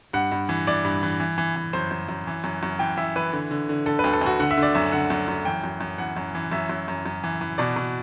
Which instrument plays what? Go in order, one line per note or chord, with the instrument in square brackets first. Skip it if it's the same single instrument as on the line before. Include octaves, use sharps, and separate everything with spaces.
[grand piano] G2 F#5
G2
E3
E3 D5
G2
E3
E3
E3
E3
F#2 C5
F#2
F#2
E3
F#2
F#2
E3 G5
E3 E5
E3 B4
D3
D3
D3
D3 A4
B4
D2
A4
D2
F#4
D3 F#5
E5
D3
D5
F#2 E5
D3 F#5
F#2
F#2
E3 G5
F#2
F#2
E3 F#5
F#2
E3
F#2 E5
F#2
F#2
F#2
E3
E3
B2 D5
B2